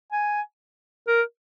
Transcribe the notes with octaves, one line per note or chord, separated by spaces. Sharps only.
G#5
A#4